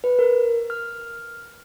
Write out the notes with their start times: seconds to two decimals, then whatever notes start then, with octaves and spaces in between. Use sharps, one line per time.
0.04 B4
0.19 A#4
0.70 F6